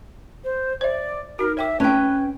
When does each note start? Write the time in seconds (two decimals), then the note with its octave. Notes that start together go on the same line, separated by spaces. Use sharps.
0.44 C5
0.81 C5 D5 E5
1.39 D#4 F#4 A#4
1.57 C#5 E5 G5 D6
1.80 C#4 B4 G5 A5